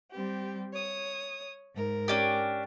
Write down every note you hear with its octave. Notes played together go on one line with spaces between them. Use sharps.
G3 C4 G4
C#5 D#6
G#2 A#4
C#4 D4 G4